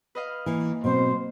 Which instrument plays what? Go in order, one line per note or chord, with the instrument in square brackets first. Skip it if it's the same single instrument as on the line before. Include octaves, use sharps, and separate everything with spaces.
[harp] B4 D#5 F5
[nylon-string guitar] E3 [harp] A#3
[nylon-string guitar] B2 F#3 C4 [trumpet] C5